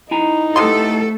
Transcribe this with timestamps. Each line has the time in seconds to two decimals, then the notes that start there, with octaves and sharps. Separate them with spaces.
0.11 D#4 E4 G#5 A#5
0.56 C3 A3 B3 A4 C6